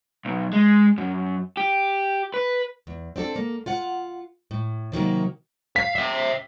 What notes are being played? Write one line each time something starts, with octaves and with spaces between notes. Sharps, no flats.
B1
G#3
F#2
G4
B4
E2
C4 D4 F#4 A4
A#3
F4 F5 F#5
A2
C3 D#3 F#3 A#3
F5 B6
E5 G5